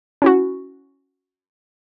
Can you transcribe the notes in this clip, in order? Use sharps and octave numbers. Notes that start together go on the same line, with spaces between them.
C#4 E4 F#4